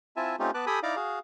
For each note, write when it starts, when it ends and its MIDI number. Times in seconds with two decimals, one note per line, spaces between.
0.16 0.36 60
0.16 0.36 64
0.16 0.36 65
0.16 0.36 76
0.16 0.36 80
0.16 0.36 81
0.39 0.51 57
0.39 0.51 60
0.39 0.51 61
0.39 0.51 63
0.39 0.51 65
0.39 0.51 67
0.54 0.65 59
0.54 0.65 71
0.54 0.65 81
0.54 0.65 86
0.54 0.65 90
0.67 0.79 67
0.67 0.79 69
0.67 0.79 79
0.67 0.79 80
0.67 0.79 83
0.67 0.79 87
0.83 0.96 63
0.83 0.96 64
0.83 0.96 74
0.83 0.96 77
0.83 0.96 82
0.83 0.96 86
0.96 1.19 66
0.96 1.19 68
0.96 1.19 77